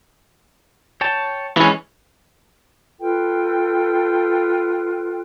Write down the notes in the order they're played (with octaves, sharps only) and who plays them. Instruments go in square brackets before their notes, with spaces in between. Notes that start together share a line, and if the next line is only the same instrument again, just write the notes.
[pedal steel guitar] C#5 G5 A5
[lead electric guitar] E3 C#4 [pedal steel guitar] G#3
[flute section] F4 A4 B4 G5